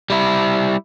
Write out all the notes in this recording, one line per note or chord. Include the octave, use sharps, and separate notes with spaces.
G3 E4